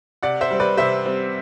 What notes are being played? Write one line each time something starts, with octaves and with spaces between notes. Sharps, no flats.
C3 D5 F#5
C5 E5
G3 C4
B4 D5
C3 C5 E5
G3 C4